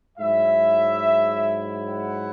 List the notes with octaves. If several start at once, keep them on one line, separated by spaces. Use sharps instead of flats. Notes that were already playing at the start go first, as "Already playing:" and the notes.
G#2 F#3 E4 E5
F#5